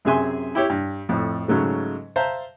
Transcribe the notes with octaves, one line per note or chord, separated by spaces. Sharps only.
F#2 C3 G#4 E5 G#5 C6
E4 G4 C#5
G2
F2 A2
G#2 C#3 F#3 A3
C5 E5 F5 A5 A#5